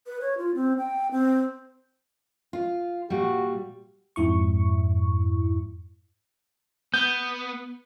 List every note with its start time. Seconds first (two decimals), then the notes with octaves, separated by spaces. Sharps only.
0.06 B4
0.21 C#5
0.38 F4
0.55 C4
0.78 G5
1.11 C4
2.53 F4
3.10 A#2 G3 F#4
4.16 F2 G#2 E4 C#6
6.94 B3 G6